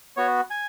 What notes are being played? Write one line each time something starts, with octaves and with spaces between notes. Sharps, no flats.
B3 F#4 C#5
G#5